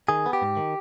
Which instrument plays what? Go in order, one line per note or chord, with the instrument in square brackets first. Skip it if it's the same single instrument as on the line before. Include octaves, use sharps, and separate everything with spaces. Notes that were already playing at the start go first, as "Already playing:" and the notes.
[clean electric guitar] D#3 G#4
B3
G4
G#2
D#3